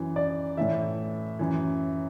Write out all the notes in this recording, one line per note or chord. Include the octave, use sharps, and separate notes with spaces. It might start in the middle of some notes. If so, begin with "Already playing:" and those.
Already playing: F#2 E3
D5
A2 E3 E5
F#2 E3